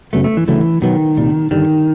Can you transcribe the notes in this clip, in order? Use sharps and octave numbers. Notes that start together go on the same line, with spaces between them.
F#2 C#3 F#3 A3 B3
A3
E3
D2 C#3 E3 F#3 A3
B2 D#3 F#3 B3
C2 A#2 G3
G2 D3 D#3 G3